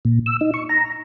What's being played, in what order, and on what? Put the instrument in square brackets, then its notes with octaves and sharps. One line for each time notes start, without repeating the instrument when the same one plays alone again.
[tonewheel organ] A#2
E6
D#4
C#6
A#5